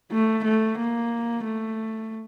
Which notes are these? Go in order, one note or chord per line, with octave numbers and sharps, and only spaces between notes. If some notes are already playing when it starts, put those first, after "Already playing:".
A3
A3
A#3
A3